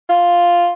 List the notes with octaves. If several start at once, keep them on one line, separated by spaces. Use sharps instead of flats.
F4